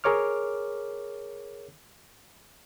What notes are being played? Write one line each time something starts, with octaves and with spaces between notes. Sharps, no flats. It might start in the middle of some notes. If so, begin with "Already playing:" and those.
G#4 A#4 C#5 D6 F6